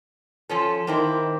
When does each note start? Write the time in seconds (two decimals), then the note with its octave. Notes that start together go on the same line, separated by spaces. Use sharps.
0.49 F3 C#4 A4
0.87 D#3 A#3 C4 E4